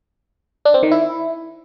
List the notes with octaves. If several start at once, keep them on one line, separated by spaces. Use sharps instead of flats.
D4
C4
D#3
E4